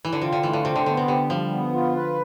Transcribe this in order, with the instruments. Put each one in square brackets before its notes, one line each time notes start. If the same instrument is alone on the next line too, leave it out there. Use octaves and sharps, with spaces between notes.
[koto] E3
D3
[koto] C3 [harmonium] F4
[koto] D3
[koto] E3 [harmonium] A3
[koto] D3
[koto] C3 [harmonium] C5
[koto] D3
[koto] D3 [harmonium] B3
[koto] C3
[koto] D3 [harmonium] G4
[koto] F3 [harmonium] G3
[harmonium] B3
F4
B4